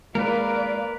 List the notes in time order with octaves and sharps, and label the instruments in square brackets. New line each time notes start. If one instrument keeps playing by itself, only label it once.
[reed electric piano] G#3 [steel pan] A#3 [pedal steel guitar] A#4 B4 [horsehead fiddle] D5 F5